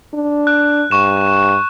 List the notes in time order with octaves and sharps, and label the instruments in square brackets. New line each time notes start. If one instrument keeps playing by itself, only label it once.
[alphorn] D4
[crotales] F#6
[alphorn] G2 [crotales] C#6 E7